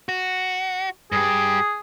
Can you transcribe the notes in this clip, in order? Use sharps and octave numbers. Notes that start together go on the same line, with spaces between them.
F#4
G2 G4 G#4